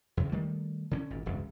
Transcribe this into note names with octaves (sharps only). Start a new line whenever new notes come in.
E2 C#3
D#3 G3 A3
D3 B3 C#4
G#1 A#2
E1 C#2 G2